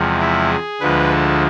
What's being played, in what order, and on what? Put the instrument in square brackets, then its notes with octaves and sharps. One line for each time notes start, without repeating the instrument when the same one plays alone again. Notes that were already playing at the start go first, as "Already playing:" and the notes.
Already playing: [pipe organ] E2 C3 F3 G#3
E4
G#4
D2 D3 F3 G#3 B4
A4